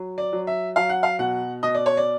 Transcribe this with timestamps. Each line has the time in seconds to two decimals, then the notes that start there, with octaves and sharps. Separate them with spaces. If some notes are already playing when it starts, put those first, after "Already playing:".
Already playing: F#3
0.18 D5
0.33 F#3
0.47 E5
0.76 F#3 F5
0.89 F#5
1.03 F5
1.19 B2 F#5
1.63 B2 D#5
1.75 D5
1.86 C#5
1.97 D5